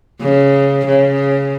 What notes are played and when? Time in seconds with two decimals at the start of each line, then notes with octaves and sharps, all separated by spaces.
0.22 C#3
0.87 C#3